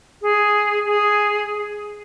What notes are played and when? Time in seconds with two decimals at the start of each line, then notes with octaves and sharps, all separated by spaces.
0.22 G#4
0.86 G#4